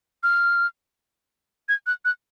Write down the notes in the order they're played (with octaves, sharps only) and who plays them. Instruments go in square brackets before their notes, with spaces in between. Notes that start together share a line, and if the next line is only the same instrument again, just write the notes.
[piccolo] F6
G#6
F#6
F#6